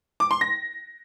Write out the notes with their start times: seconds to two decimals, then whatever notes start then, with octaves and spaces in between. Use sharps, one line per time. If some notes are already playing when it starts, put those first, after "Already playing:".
0.20 D6
0.31 C6
0.41 A#6